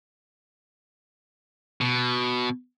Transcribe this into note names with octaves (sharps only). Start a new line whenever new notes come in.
B2